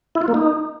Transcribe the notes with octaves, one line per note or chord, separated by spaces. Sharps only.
E4
F4
A#3
D#4